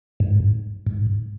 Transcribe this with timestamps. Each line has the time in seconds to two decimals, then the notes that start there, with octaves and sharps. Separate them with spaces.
0.20 G#2
0.87 G#2